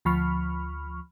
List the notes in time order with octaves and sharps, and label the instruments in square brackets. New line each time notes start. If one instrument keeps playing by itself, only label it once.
[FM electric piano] D2 F3 B5 C#6 F6